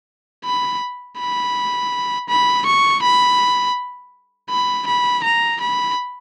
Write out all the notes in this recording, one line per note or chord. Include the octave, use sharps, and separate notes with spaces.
B5
B5
B5
C#6
B5
B5
B5
A#5
B5